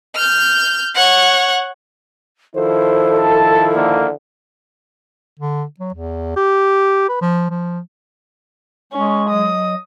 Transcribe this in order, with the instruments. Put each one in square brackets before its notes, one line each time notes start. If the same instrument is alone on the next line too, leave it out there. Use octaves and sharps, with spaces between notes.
[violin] F6 G6
C#5 F#5
[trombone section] D#3 F3 E4 [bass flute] A4 [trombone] C5
[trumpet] A5
[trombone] D3 [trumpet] A#3
[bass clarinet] D3
F#3
E2
G4
B4
F3
F3
[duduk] G#3 [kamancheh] C#4 [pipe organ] C#6
[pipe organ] F#3 D#5 [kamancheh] D#6